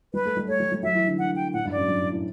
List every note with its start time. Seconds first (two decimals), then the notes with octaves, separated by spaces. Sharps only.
0.14 G3 B4
0.25 A3
0.37 G3
0.48 A3 C#5
0.60 G3
0.72 G3
0.83 F#3 E5
0.95 E3
1.07 D3
1.18 D3 F#5
1.36 G5
1.53 A2 F#5
1.65 G2
1.72 F#2 D5
1.88 G2
2.00 A2
2.12 A2